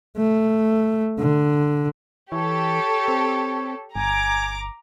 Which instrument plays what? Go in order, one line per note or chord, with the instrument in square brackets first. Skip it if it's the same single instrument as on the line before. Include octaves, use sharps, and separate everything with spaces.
[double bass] A3
D3
[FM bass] E3 [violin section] G4 A4 [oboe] C#5
[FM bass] C4
[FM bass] G1 [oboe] G#5 [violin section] A#5 D6